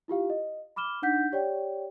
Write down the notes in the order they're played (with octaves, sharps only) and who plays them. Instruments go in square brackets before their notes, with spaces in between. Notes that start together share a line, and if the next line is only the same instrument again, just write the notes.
[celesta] E4 F4 G4 F5
D#5
B5 D6 F6 E7 G7
D4 D#4 F#5 G6 B6
G4 C#5 D5 G5